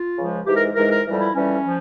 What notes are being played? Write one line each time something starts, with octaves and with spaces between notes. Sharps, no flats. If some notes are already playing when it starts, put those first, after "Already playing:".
Already playing: F4
C#2 C#3 F3 G#3
G#2 E3 G#3 G4
A#4
G#2 E3 G#3 A#4
A#4
F2 E3 G3
E4
F2 E3 G3 C#4
F3